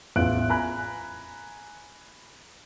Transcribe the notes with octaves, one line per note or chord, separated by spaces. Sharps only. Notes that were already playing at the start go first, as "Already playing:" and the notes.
A1 E2 F4 E5 F#6 D7
G#5 A#5 B5 F#6